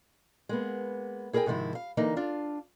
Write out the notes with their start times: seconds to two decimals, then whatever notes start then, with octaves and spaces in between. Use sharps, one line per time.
0.49 G#3 A#3 B3
1.33 E4 G#4 A#4 C#5 G5 G#5
1.46 G#2 C3 D#3 F3 E4
1.75 F5
1.97 D3 E3 A#3 D#4
2.16 D4 F4 F5